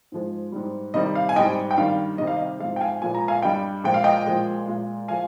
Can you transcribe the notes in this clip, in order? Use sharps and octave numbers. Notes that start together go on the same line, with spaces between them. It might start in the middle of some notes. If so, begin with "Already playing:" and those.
G#2 F3 G#3
G#2 G3
C3 D#3 G3 D#5
F5
G#5
G#2 G3 D#5 G5
G5
G2 D#3 G3 F5
C3 D#3 G3 D#5
F5
D#5
G#2 F3 G#3 F5
G5
F5 G#5
A#2 F3 G#3 G#5
A#5
F5 G#5
G2 G3 D#5 G5
A#2 F3 G#3 G5
F5
D#5 G5
A#2 F3 G#3
A#2 G#3
F3 G#3 F5 G#5